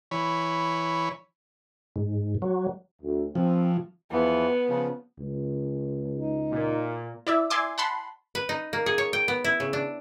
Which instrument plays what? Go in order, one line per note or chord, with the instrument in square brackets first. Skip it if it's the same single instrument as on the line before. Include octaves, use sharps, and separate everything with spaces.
[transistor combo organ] E3 C#5 B5
[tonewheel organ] G#2
F#3
[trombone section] D2
[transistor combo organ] F3 [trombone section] C4
[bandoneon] E2 E3 F3 [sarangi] B3
[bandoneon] C#3 F3
[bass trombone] C#2
[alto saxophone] D#4
[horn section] A#2
[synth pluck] E4 D5 E5
D5 E5 G#5 C6 D6
F#5 A5 B5 C6
[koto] B4
D#4
A#3
G#4
C#5
G5
B3
E4
C#3
D4